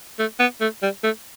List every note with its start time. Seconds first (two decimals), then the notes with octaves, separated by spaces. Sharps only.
0.19 A3
0.40 B3
0.61 A3
0.83 G3
1.04 A3